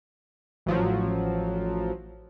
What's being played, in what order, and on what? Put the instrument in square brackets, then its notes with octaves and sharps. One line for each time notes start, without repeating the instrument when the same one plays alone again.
[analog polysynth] A1 F3 F#3